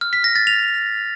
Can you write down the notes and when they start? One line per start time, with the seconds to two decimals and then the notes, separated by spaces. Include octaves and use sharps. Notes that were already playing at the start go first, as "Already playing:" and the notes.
0.01 F6
0.13 B6
0.24 A#6
0.36 A6
0.47 F7